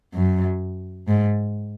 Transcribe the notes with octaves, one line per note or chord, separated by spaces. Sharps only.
F#2
G#2